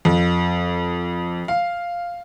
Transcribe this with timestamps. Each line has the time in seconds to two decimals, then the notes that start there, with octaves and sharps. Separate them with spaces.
0.05 F2
1.48 F5